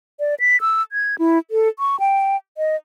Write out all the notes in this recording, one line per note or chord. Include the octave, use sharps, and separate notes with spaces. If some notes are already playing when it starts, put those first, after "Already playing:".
D5
B6
E6
G#6
E4
A4
C#6
G5
D#5